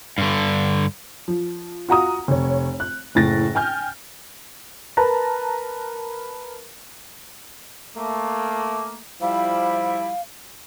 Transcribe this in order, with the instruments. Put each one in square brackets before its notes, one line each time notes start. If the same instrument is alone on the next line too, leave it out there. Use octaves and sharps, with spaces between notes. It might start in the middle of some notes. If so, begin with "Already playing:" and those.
[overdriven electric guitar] G2 D3
[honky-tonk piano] F3
F4 F#4 A#5 D#6
F1 C#5
F#6
F#1 A2 A6 A#6
G5 G#5 F6 G6
[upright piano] A#4 B4 A5 A#5
[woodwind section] A3 A#3
[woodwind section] F3 G3 E4 [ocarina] F5